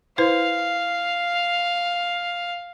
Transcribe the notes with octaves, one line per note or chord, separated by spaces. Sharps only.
E4 B4 C5 F5